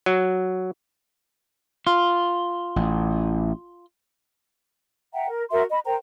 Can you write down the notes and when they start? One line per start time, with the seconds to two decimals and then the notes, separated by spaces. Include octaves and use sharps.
0.06 F#3
1.87 F4
2.76 A1
5.14 E5 F#5 G5 A#5
5.29 A#4
5.51 F#4 A#4 E5 C6
5.70 D#5 B5
5.86 A#4 C5 G5 A#5